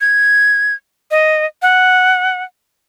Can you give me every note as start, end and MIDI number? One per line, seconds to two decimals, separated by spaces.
0.01 0.74 92
1.11 1.46 75
1.62 2.43 78